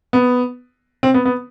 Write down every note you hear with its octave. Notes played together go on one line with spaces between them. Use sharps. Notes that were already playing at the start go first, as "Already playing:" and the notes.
B3
C4
B3
B3